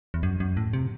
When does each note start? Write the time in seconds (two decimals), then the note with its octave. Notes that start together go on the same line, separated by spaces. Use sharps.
0.14 E2
0.23 F#2
0.40 F#2
0.57 A2
0.73 C3